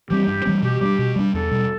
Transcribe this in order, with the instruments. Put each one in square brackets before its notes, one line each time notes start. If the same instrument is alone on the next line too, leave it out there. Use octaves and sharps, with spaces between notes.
[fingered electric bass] E3 G3 C4 [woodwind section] G4
[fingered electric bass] G2
E3 G3 C4
[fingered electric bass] B2 [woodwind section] G4
[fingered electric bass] G3 B3 D4
B2
G3 B3 D4
[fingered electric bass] E2 [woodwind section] A4
[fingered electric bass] B2 G3